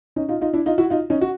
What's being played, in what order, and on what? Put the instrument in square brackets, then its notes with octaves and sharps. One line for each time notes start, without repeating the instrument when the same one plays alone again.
[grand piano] C#4 D#4
D#4 F4
D#4 F4
D4 E4
D#4 F4
E4 F#4
D#4 F4
C#4 D#4
F#4